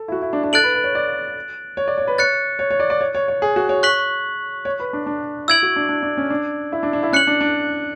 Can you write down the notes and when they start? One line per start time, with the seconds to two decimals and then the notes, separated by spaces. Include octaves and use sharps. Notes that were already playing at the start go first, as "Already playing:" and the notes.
Already playing: A4
0.08 E4
0.12 F#4
0.22 E4
0.33 D4
0.44 D4
0.53 A4 F#6 A6 D7 F#7
0.64 B4
0.74 B4
0.84 C#5
0.95 D5
1.77 C#5
1.88 D5
1.98 C#5
2.07 B4
2.18 C#5 F#6 A6 C#7
2.59 C#5
2.71 C#5
2.80 D5
2.90 D5
3.01 C#5
3.15 C#5
3.28 C#5
3.42 G#4
3.56 F#4
3.69 C#5
3.83 C#6 F#6 B6 F#7
4.65 C#5
4.80 B4
4.93 D4
5.06 D4
5.48 E4 E6 G#6 D7 F#7
5.63 F#4
5.76 D4
5.89 D4
6.03 D4
6.17 C#4
6.30 D4
6.72 E4
6.83 D4
6.93 D4
7.03 E4
7.13 C#4 F#6 C#7 F#7
7.27 D4
7.41 D4